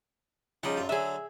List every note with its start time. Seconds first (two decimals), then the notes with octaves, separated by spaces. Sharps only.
0.63 C#3 F3 G3 D#4 F#5
0.77 F#2 F4
0.89 D3 F#3 G#4 E5